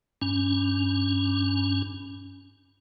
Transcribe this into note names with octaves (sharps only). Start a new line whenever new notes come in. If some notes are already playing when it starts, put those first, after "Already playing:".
G2 C#4